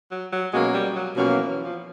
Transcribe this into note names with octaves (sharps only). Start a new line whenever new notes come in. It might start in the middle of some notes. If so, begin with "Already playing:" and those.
F#3
F#3
B2 F#3 G#3 A#3 C#4 F#4
G3
F#3
B2 F3 F#3 A#3 C#4 F#4
E3
F3
E3
F3